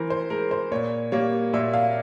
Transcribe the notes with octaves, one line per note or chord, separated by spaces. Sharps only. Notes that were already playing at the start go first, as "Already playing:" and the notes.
Already playing: E3 A#4 C5
C5
G#3 A#4
C5
A#2 C#5
G3 A#3 C#5
A#2 E5
F5